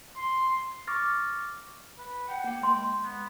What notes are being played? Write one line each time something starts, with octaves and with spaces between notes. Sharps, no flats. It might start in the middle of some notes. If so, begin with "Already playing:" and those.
C6
C#6 D6 F6 A6 A#6
B4
F#5 G5
A#3
G#3 C6
B3